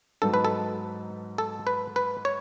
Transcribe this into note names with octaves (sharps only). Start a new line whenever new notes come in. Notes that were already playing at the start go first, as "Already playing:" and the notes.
G#2 F#3 B3 D#4 A4
B4
A4
A4
B4
B4
C#5